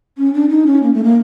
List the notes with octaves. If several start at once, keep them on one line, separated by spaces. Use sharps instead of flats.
C#4
D4
D#4
C#4
A#3
A3
A#3